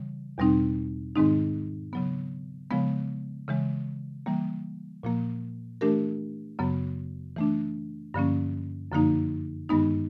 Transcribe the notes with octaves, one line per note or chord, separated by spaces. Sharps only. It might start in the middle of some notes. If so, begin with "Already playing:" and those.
Already playing: C#3 E3 G3
E2 B2 G3 C4 D#4
G#2 D#3 G#3 C4 D#4
C#3 F#3 B3
C#3 F3 G#3 B3
C#3 E3 G#3
E3 G3 A#3
A#2 F3 A#3
E3 A3 D4 G4 A#4
F#2 C#3 F#3 B3
E3 A3 D4
G2 D3 F3 A#3 C#4
F#2 D3 F3 A#3 D#4
G2 D#3 G#3 B3 D#4